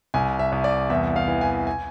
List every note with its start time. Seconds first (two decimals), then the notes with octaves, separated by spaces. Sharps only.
0.14 C2 G#5
0.39 E5
0.52 C2
0.64 D5
0.90 E2 E5
1.16 F5
1.28 E3
1.41 G#5
1.67 G#5